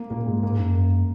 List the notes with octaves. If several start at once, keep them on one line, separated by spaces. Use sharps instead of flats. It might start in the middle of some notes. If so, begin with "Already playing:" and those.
Already playing: A#3
A#2 A#3
G#2 G#3
G#2 A#3
F#2
A#3